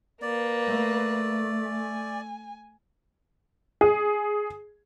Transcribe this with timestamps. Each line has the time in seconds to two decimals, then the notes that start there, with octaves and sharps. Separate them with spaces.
0.22 A#3 B4 D5
0.67 A3
1.69 G#5
3.81 G#4